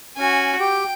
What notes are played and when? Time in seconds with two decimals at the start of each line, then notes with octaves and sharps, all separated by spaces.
0.17 C#4 F#4 G#5
0.60 G4 G5